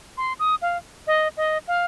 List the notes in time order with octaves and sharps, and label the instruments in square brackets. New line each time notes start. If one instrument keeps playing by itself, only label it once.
[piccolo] C6
D#6
F5
D#5
D#5
F5